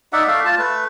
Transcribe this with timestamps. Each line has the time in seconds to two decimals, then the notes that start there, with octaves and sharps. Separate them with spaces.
0.13 D#4 D5 E5 F#5
0.27 A3 D5 E5 F5
0.45 F4 A5
0.59 A3 B4